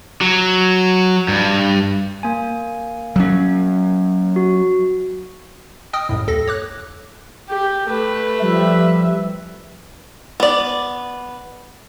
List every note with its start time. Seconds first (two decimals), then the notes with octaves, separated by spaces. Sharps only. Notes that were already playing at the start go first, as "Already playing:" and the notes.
0.21 F#3
1.28 G2
2.23 A#3 G#5
3.16 F#3 C#4
4.36 F#4
5.93 D#5 G5 D#6 F6
6.09 C2 F#2 A2
6.27 D#2 A4 A#6
6.48 C#5 D6 F#6
7.49 G4
7.86 A3 B4
8.39 F3 G3 E5
10.40 B3 D5